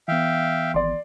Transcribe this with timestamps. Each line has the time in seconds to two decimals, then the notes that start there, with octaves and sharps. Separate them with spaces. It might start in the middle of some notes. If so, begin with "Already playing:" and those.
0.08 E3 B3 E5 F5 G5
0.74 G#1 D5 C6